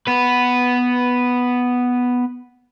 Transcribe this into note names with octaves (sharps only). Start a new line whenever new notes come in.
B3 B4